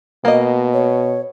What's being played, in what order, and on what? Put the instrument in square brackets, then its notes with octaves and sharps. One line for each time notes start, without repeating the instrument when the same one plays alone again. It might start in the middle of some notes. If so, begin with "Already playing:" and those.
[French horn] B2 [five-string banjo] A#3 D#5
[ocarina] C#5